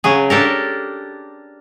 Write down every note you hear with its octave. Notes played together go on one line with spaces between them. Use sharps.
C#3 F#3 G#4
D4 G4 A4 A#4